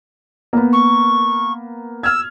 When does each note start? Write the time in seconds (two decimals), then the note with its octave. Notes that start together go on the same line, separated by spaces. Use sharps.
0.53 A#3 B3
0.72 C#6
2.03 E6 F6 G#6